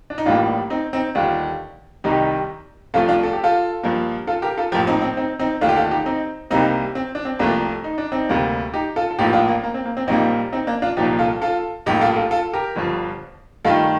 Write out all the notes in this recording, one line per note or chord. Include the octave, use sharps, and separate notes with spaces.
D4
D#4
A1 A2 G3 A#3 D4 F4
C4 D#4
C4 D#4
D#2 D3 G3 D4 F4
C2 C3 D#3 G3 D#4 G4
C2 C3 F3 A3 F4 A4
D4 F4
A4
G4
F4 A4
G2 F3 A#3
F4 A4
G4 A#4
F4 A4
A#1 A2 F3 G4 A#4
C4 D#4
C4
C4 D#4
C4 D#4
D#2 D3 A3 D4 F4
G4
F4 A4
D#4 G4
C4 D#4
C2 C3 G3 A#3 C4 D#4
C4
D4
C4
C2 C3 F3 A3 A#3 D4
D#4
D4
C4 D#4
D2 C3 G3 A#3
D#4 G4
F4 A4
A4
A#1 A2 F3 A#3 D#4 G4
D4 F4
A#3
A#3
C4
A#3
C4
A#1 A#2 G3 A#3 C4 D#4
C4 D#4
A#3 D4
D4 F4
C2 A#2 F3 D#4 G4
F4 A4
F4 A4
A#1 A2 G3 A#3 D#4 G4
F4 A4
F4 A4
F4 A4
G4 A#4
G1 G2 F3
G2 D#3 A3 F4 A4